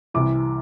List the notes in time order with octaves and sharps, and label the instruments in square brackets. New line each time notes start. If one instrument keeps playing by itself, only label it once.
[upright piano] C2 C3 E3 D6